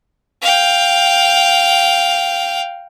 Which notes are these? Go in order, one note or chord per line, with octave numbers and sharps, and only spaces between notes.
F5 G5